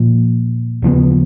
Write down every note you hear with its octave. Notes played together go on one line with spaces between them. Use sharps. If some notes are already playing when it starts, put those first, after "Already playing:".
Already playing: A#2 F3 A#3
D#2 C#3 F3 B3